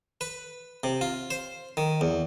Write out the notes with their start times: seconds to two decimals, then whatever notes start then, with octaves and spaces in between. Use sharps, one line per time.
0.21 B4
0.84 C3
1.01 F4
1.30 C5
1.77 D#3
2.01 E2